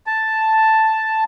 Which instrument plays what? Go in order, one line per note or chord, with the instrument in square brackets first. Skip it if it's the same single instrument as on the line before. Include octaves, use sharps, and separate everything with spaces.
[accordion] A5